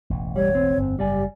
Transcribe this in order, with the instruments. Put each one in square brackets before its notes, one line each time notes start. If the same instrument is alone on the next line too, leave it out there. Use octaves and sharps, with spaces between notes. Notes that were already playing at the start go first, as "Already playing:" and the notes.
[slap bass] E1 A1
[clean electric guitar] G3 [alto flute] C#5
[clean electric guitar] C4
[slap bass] G1 F2
[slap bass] F#1 G#2 [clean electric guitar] G3 D5 G#5 [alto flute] G4